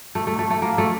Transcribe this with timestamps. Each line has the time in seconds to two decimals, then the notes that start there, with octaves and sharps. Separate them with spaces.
0.15 A3
0.27 A3
0.39 A3
0.50 A3
0.62 A#3
0.78 A3